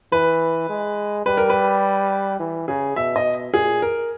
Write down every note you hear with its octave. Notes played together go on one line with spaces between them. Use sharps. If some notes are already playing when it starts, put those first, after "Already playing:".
E3 B4
G#3
G3 B4
A#4
B4
E3
C#3 G#4
B2 E5
D#5
A#2 G#4
A#4